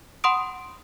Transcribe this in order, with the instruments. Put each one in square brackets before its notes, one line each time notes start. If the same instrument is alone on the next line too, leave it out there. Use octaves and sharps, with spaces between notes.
[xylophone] F#5 B5 C6 D#6 D7